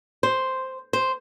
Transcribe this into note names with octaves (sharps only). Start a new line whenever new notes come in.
C5
C5